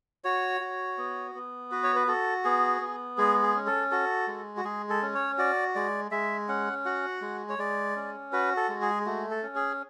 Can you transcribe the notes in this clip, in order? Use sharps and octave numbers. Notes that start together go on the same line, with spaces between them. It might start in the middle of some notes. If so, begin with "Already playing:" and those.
F#4 C#5
F#4
B3
B3
F#4 B4
C#5
B4
F#4 A4
B3 G#4
B3
G#3 G#4
G#4
C#4
A4
F#4 A4
G#3
F#4
G#3 G#4
A4
C#4
C#5
F#4 D5
G#3 D5
G#3 E5
C#4 F#5
F#4 F#5
G#3
C#5
G#3 D5
C#4
F#4 B4
A4
G#3
G#4
A3 F#4
A4
C#4
G#4